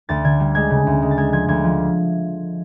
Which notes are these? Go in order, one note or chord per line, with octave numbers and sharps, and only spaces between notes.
D2 A6
D3 G#6
G3
G#3 G#6
C#3
D2
G#3
A6
G#3 G#6
F3 G#6
D2 G#6
F3